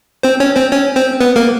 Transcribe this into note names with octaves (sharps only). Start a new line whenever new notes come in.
C4 C5
C#4 C#5
C4 C5
C#4 C#5
C4 C5
B3 B4
A#3 A#4